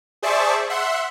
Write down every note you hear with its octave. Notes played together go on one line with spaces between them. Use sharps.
G#4 C5 D5 E5 A5 C#6
E5 F#5 C6